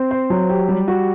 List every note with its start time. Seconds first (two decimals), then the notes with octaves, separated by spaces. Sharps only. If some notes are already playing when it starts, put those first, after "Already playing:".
Already playing: C4
0.11 C5
0.30 F#3
0.49 G4
0.68 G3
0.88 F#4